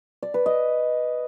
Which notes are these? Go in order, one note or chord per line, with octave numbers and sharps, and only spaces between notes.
D5
B4
D#5